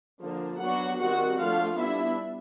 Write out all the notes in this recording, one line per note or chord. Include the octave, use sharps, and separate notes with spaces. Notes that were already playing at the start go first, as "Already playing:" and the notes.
D3 F3 A#3 D4
F#3 B3 D4 F#4 F#5
D#3 G3 C4 F#4 F#5
F3 A3 D4 F4 F5
G3 B3 D4 E4 E5